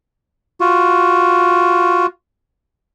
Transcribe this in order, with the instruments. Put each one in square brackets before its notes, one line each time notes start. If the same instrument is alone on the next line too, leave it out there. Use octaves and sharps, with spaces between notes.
[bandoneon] F4 F#4